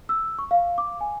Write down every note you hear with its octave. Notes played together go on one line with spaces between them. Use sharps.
E6
C#6
F5
D6
G#5